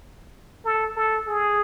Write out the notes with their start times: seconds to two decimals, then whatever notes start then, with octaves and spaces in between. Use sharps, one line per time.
0.65 A4
0.96 A4
1.27 G#4